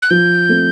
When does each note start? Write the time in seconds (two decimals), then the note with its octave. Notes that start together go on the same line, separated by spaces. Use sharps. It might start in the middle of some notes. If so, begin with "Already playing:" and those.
0.02 F#6
0.10 F3 G6
0.49 A3 C4